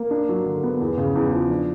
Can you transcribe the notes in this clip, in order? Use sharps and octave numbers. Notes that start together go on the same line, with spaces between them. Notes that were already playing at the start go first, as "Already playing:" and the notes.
Already playing: A#3
D4
F#3
D3
B3
E2
C#3
E2
F3
D4